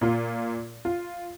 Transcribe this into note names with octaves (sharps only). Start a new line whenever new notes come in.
A#2 F4
F4